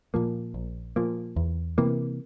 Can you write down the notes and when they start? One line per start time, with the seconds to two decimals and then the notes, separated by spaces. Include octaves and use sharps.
0.14 A#2 F3 A#3
0.54 A#1
0.96 A#2 F3 A#3
1.36 E2
1.78 C3 E3 A#3